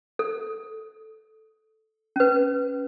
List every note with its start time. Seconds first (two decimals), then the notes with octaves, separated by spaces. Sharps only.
0.19 A4
2.16 C#4 B4